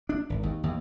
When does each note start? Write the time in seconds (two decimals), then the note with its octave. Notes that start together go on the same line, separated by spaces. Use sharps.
0.09 D4
0.30 G#1
0.43 D#2
0.63 D#2